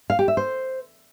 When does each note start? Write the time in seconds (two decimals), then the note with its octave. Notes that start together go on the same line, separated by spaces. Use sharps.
0.10 F5
0.19 G4
0.28 E5
0.37 C5